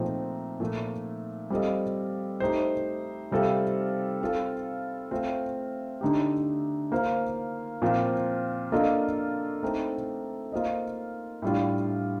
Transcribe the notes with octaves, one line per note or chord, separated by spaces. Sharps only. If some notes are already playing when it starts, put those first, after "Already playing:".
Already playing: A#2 F3 A3 C4 D#4
A#2 F3 A3
G3 C4 F4 A4 D#5
A3 D#4 G4 C5
C3 G3 C4 F4 A4
C4 F4 A4
A3 C4 F4
D3 A3 D#4 G4
A#3 F4 C5 F5
A#2 F3 C4 F4
A#3 D4 F4 A4 D#5
A3 C4 D#4 A4
A#3 F4 C5 D#5
A2 G3 D4 F4